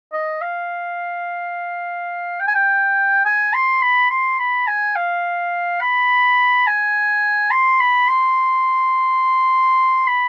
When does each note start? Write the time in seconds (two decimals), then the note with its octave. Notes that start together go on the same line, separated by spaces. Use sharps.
0.13 D#5
0.41 F5
2.40 G5
2.48 G#5
2.55 G5
3.25 G#5
3.54 C6
3.82 B5
4.10 C6
4.39 B5
4.68 G#5
4.96 F5
5.81 B5
6.67 G#5
7.51 C6
7.80 B5
8.08 C6
10.08 B5